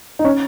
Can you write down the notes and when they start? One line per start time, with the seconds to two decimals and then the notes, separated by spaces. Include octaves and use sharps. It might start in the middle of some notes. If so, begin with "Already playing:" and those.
0.19 D#4
0.25 C#4